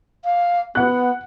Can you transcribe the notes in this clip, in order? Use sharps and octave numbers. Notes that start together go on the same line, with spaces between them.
F5
B3 F#5 F#6